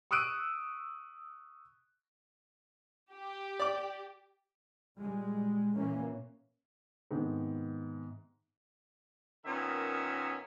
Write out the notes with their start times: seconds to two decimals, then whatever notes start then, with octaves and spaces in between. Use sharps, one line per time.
0.11 C#6 D#6 E6 F#6 D7 D#7
3.13 G4
3.60 D5 D6
4.98 A#2 G3 G#3
5.77 A#2 E3 A#3 C#4
7.11 G#2 C3 D#3 B3
9.46 A#2 D#3 B3 C#4 A#4 E5